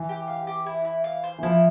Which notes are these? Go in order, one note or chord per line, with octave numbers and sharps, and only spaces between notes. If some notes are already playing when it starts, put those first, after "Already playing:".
Already playing: E3
G4
F5
G4
E4
E4
F5
C5
E3
F3 E4